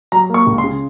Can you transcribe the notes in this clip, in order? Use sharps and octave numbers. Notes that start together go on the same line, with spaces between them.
F#3 A#5
A#3 C#6
C#2
C6
C#3